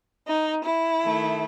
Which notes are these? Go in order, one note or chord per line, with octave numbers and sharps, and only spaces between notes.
D#4
E4
D#3 A3